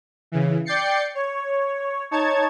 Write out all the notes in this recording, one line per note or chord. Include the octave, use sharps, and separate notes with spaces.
C#3 E3
D5 G5 G6 A6 C7 C#7
C#5
D#4 C#5 A5 G#6